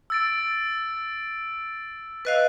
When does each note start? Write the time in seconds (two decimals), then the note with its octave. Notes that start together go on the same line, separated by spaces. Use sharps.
0.10 E6 A6 D7
2.25 B4 D#5 F5 E6 F#6 C7